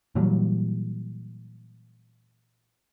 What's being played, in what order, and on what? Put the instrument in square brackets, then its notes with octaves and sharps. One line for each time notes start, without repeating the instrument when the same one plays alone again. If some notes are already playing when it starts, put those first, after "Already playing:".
[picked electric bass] A#2 E3 F#3 G3